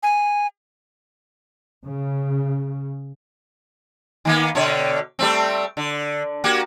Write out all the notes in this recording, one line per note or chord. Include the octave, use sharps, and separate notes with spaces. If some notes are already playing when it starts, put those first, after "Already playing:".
G#5
C#3
D#3 A#3 B3
B2 D3 C#5
G3 A3 C4
D3
A#3 F#4 G4